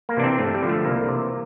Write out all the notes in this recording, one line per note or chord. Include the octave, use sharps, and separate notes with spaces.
A#3
C3 E3 D4
C4
G2 A3
G3
D3 F3
A3
C2 A#3
C3 E3